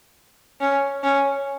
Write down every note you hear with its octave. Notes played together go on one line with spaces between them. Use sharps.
C#4
C#4